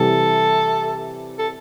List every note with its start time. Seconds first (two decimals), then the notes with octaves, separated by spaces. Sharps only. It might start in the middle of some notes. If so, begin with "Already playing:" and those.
Already playing: C3 E3 G3 A4
1.39 A4